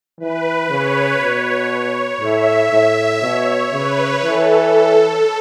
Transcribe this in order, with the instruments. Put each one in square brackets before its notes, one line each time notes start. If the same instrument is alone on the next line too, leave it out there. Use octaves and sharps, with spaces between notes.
[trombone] E3 [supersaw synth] B4
[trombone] C#3 [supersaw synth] C#5
[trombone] B2
[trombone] A2 [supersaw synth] E5
[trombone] A2
[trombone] B2 [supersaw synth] C#5
[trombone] C#3 [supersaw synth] B4
[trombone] E3 [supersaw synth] A4
[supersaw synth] A4